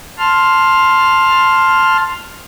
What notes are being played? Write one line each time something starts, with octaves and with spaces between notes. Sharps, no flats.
A5 C6 F6